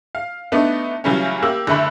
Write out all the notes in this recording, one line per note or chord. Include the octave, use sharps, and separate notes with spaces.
F5
A3 B3 D4 D#4
C#3 E3 F#3 G3 A3 C#4
A#3 G4 E6 F#7
F#1 D3 A3 E5 B5 F#7